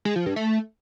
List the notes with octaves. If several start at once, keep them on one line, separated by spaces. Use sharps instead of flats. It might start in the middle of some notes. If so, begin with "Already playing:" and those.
G#3
F3
G2
A3